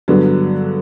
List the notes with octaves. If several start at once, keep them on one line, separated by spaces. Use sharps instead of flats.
G2 D3 F#3 B3